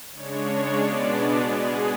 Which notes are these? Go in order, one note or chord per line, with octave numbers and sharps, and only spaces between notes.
C#3 G#3 D4 C#5
B2 G#3 B3 D4 D5
D5
B2 G#3 B3 G#4